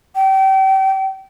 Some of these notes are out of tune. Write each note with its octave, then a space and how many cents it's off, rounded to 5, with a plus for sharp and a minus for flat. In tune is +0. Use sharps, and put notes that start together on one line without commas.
G5 -30